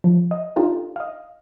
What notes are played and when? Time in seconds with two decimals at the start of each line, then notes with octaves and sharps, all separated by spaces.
0.04 F3
0.31 D#5
0.56 D4 D#4 F4 G4 A4 A#4
0.96 D#5 F5